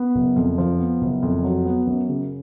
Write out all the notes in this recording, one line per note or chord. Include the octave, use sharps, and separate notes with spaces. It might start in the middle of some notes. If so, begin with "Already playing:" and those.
Already playing: B3
F#1
F2
F3
B3
F#1
F2
F#3
B3
F#2
C#3